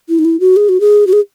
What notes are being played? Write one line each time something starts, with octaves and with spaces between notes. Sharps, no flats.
E4
D#4
E4
F#4
G#4
F#4
G#4
F#4
G#4